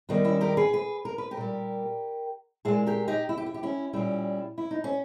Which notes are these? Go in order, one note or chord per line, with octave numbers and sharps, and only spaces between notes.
D#2 D#3 G3 B3
C#4 E4
G4 A#4
G#4 B4
G#4 B4
A#4
B4
G4 A#4
A#2 G3
A#2 G#3 E4 G#4
G4 A#4
D#4 G4
E4
G4
E4
G4
C#4 E4
A#2 G3 C#4 E4
E4
D#4
C#4